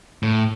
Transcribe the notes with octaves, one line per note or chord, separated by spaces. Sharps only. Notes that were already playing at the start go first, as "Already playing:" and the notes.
A2